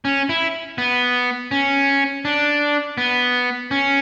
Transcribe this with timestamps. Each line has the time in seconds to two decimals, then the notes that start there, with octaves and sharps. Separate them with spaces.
0.05 C#4
0.29 E4
0.78 B3
1.51 C#4
2.25 D4
2.98 B3
3.71 C#4